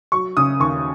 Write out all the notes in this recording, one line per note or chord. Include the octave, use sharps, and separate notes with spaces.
F#3 C#6
C#3 D#6
D#2 C#6